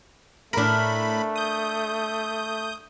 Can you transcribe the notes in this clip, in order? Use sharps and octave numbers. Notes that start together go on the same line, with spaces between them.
A2 A3 D4 A#4 B5
D#6 G6